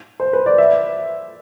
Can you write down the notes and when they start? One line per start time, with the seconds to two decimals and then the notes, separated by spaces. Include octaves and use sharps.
0.20 C5
0.33 B4
0.46 D5
0.58 E5